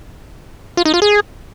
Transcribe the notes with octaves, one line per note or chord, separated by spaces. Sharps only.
F4
D#4
F4
G#4